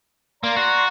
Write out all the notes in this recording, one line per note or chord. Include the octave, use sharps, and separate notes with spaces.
A#3 D5 A#5 C6
F#4